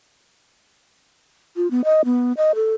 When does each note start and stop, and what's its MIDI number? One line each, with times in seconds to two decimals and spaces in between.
1.57 1.70 65
1.71 1.81 59
1.84 2.02 75
2.05 2.33 59
2.37 2.52 75
2.55 2.75 69